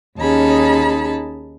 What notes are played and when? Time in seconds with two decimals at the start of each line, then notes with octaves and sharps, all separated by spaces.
0.19 D#2 C#4 D#4 G#4 A5 B5